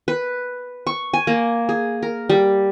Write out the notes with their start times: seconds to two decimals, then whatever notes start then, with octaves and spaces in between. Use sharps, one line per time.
0.08 B4
0.87 C#6
1.14 G#5
1.27 A#3
1.69 G#4
2.03 A#4
2.30 G3